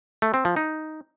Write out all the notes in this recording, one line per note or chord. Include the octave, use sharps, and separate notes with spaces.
A3
C4
F3
D#4